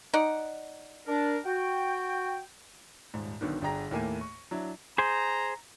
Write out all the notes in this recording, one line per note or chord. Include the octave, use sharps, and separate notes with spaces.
D#4 D5 F#5
D4 A#4
F#4 G5
D#1 G#2
B1 B2 D3 D#3
G1 D4 G#4 G5 A#5 A#6
D#2 A2 A3 A#3 G#5 D#7
C#6
F#3 D4 E4
G#4 C5 A#5